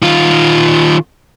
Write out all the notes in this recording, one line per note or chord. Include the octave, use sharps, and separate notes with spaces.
D#3 F4